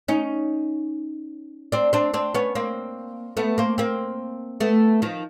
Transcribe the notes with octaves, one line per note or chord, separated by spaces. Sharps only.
C#4 D#4
C4 D4
C4 D4
C4 D4
B3 C#4
A#3 C4
A3 B3
A#3 C4
A#3 C4
A3 B3
D#3 F3